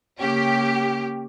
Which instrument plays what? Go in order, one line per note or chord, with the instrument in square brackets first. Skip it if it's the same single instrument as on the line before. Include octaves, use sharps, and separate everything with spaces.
[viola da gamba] C#3 A#3 C#4 [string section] G4